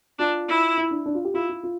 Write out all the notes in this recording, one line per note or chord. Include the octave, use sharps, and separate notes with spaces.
D4 F4
E4
E4
D4
D4
F4
G4
E4 F4
F4
F4